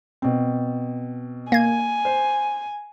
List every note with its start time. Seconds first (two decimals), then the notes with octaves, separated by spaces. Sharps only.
0.22 B2 C4
1.52 A#3 G#5 G#6
2.05 C5